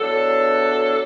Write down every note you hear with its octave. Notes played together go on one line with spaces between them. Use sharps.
E2 F#3 D4 A4